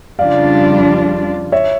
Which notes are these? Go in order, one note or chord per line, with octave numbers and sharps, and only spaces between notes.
F2 C#3 G3 D4 F4 D5 F5
C#5 E5